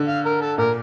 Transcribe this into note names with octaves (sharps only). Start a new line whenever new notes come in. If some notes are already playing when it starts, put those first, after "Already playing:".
Already playing: D3
F5
A#4
A4
A#2 A#4